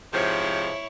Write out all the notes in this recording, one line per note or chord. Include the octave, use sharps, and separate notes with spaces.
G#2 C3 F3 E4 C#5